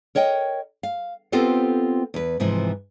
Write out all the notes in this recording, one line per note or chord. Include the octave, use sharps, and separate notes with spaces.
A#4 C#5 D#5 G5
F5
B3 C4 F4 G4 A4 C5
E2 B4
G#2 C3 E3 F3